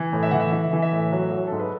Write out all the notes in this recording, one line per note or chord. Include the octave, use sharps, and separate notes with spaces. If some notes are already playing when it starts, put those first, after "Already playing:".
Already playing: E3
A2
E5
E3 F#5
E5
E3 E5
E3
E5
A2
F#3
F#3
G#2 A4
B4